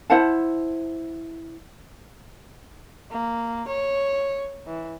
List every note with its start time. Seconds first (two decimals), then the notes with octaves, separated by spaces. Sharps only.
0.10 E4 C5 F#5 A5
3.11 A#3
3.68 C#5
4.67 E3